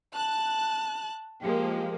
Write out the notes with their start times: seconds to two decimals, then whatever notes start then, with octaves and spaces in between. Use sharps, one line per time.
0.15 A5 F#6
1.42 F3 G#3 A#3 G4